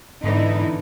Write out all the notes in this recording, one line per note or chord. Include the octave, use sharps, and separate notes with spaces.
G#2 D3 E3 B3 D#4 E4 D5